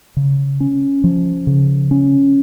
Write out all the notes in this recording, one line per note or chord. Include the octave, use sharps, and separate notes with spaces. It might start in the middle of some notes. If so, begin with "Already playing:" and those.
C#3
C#4
F3
C#3
C#4